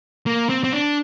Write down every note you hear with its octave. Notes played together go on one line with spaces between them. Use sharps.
A#3
C4
C4
D4